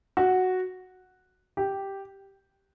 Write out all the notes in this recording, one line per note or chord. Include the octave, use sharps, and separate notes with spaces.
F#4
G4